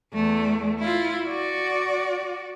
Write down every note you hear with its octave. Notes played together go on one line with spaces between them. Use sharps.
E2 A3
E4 F4
F#4 D5